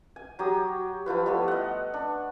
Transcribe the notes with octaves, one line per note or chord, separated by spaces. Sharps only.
G#5
F#3 G4 D#6
F3 E4 F4 B4
G3 A3 B3
D#5 F#5
D4